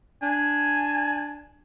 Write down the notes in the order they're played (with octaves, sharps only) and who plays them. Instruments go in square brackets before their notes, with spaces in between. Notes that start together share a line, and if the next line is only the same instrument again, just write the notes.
[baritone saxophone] D4 [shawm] G#5